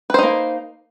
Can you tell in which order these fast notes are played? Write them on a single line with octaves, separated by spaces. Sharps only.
B4 C5 D#4 A#3